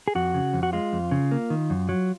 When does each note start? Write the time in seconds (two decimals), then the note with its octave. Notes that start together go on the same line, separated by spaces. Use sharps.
0.08 G#4
0.15 F2 F#4
0.34 C#3
0.53 F2
0.63 F#4
0.73 G#3 F4
0.93 F2
1.11 C#3
1.31 A#3
1.50 D#3
1.70 F#2
1.89 F#3